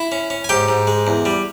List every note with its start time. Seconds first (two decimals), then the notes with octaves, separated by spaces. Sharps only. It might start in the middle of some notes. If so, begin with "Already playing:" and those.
Already playing: E4 E5
0.12 C#4
0.30 C#4
0.44 G#5
0.49 G#2 G4 G5
0.69 G#2
0.87 G#3
1.07 E2
1.25 G3